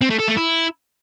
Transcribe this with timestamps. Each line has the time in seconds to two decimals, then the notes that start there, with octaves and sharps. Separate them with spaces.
0.01 C4
0.10 A3
0.19 A4
0.28 A3
0.37 E4